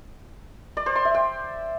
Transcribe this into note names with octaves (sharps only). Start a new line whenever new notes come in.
D5
C5
C6
E5
G5